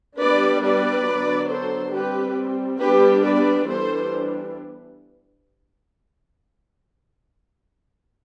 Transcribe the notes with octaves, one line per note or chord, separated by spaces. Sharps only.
G3 B3 D4 B4 D5
B4 D5
D3 F#3 B3 D4
A4 C5
G3 C4 G4 B4
G3 B3 D4 G4 B4
B4 D5
E3 G3 B3 D4 A4 C5